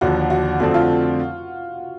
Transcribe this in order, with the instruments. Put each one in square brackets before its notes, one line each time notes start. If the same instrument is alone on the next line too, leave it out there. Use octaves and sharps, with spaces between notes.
[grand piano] D#2 D3 F3 [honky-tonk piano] F#4
[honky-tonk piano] F#4
[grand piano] F2 D3 F3 A3 C4 [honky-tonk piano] F#4
[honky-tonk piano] F4